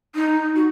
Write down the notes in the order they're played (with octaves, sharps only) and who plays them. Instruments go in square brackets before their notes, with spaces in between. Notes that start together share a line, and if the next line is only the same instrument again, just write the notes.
[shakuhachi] D#4
F#4